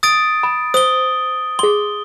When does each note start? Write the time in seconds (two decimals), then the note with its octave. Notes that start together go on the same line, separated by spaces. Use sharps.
0.03 D#6 A6 D7
0.43 B5
0.74 C5 D#6 G7
1.59 G#4 C6 G7